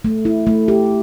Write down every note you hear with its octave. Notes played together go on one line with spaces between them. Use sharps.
A3
E4
A3
G4